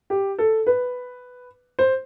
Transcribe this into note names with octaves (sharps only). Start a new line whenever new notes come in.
G4
A4
B4
C5